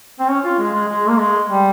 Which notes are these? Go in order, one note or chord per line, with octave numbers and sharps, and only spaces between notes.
C4
C#4
F4
G#3
G#3
G#3
A#3
G#3
G3